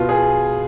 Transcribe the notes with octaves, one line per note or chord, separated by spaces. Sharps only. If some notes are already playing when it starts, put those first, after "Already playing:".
Already playing: B2 F4
G#4